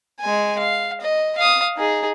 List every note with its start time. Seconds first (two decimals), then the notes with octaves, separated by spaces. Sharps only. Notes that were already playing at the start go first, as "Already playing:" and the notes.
0.20 G#3 G#5
0.58 F5
1.01 D#5
1.37 F5 D#6
1.77 D#4 G#4